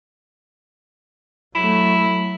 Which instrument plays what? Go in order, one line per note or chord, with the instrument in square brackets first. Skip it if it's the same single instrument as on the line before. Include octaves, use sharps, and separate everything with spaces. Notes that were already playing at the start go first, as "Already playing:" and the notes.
[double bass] F#3 A3 [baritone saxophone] E4